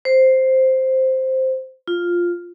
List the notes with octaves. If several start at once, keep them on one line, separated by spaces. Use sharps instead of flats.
C5
F4